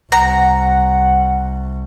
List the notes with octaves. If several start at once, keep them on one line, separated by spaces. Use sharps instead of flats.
C2 F#5 A#5